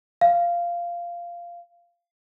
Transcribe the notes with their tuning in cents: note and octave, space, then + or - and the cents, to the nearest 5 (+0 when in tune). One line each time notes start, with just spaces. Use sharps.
F5 -10